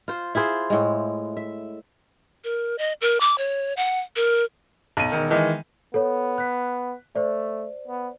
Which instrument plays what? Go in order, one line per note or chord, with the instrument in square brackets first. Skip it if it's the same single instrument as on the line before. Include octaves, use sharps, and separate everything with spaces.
[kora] F4 C5
E4 F4 G#4 C5
A2 G#3
E5
[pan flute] A#4
D#5
A#4
D6
C#5
F#5
A#4
[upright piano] B1 D#7
E1 D#3
D#3 E3 G#3
[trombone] B3 [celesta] A4 C#5
[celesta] F#6 B6
[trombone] A3 [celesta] C5 D5
[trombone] B3